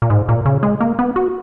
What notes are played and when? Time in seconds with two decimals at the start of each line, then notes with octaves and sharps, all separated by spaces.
0.02 A#2
0.10 G#2
0.28 A#2
0.45 C#3
0.63 G#3
0.80 A#3
0.99 B3
1.16 F#4